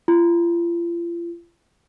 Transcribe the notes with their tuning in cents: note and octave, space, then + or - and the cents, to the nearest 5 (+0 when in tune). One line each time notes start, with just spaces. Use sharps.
F4 -40